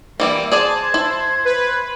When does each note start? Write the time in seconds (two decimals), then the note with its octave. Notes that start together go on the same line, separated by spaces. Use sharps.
0.20 E3 G3 A#3 E4 D5
0.52 G#4 C5 D5 G#5 A5 G#6
0.94 E4
1.45 B4